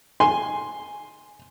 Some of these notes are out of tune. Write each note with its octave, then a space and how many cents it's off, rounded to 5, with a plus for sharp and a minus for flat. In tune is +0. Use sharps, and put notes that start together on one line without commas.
G#5 +0 C6 +0